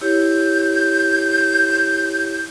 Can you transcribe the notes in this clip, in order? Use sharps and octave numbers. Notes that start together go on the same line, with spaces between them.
E4 G4 C#5 G6